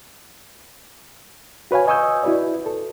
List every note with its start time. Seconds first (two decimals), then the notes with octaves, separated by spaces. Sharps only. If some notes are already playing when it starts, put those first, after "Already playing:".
1.71 F#4 B4 C#5 F5 G#5
1.87 D#5 G#5 C#6 D#6 E6 G6
2.23 E4 F#4 B4 D5
2.66 A4